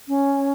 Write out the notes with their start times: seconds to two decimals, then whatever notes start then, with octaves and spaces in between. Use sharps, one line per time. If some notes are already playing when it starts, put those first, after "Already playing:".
0.08 C#4